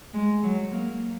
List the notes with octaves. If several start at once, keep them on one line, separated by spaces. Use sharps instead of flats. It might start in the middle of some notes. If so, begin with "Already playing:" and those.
G#3
F#3
A#3